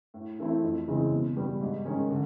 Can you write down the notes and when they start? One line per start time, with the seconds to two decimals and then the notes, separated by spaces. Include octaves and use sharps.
0.14 A2
0.39 E3 A3 C4 E4
0.63 F2
0.87 C#3 E3 G#3 C4
1.12 B2
1.37 G3 B3
1.61 G#2
1.85 D#3 G#3 C#4
2.11 D3